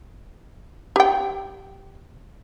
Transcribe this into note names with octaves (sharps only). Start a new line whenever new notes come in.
G4 G5